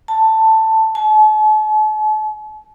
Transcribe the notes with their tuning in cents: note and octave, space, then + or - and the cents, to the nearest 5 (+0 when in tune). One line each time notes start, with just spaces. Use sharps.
A5 +10
A5 -45